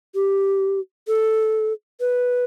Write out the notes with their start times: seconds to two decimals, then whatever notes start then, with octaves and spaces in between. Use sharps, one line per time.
0.15 G4
1.08 A4
2.00 B4